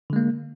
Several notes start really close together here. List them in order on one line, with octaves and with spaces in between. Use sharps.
D3 G#3 A#3